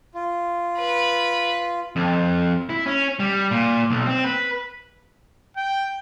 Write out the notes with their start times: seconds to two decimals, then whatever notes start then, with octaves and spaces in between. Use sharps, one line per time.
0.15 F4
0.78 B4
1.96 F2
2.69 E4
2.86 C#4
3.20 G3
3.51 A#2
3.90 B1
4.06 C4
4.24 B4
5.56 G5